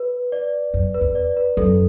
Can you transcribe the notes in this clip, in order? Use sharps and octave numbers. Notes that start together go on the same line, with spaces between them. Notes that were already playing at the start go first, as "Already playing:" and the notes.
Already playing: B4
D5
F#2
B4
E2
D5
B4
F#2 A4